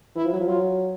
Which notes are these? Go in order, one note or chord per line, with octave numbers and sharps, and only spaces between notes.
E3 E4
F3
F#3
F3
F#3 F4